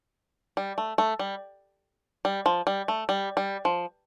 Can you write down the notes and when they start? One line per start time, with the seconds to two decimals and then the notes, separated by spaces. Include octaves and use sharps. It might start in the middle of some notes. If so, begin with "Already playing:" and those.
0.57 G3
0.78 A3
0.98 A3
1.19 G3
2.25 G3
2.46 F3
2.67 G3
2.88 A3
3.09 G3
3.37 G3
3.65 F3